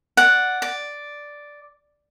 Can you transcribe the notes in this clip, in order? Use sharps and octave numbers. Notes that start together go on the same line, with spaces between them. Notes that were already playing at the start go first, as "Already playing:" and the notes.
D5 F#5
D5